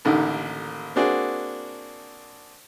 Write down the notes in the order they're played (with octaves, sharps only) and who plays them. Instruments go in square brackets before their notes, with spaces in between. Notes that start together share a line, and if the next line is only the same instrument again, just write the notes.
[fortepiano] A1 D#2 D3 D#3
A#3 C4 D4 F#4 G#4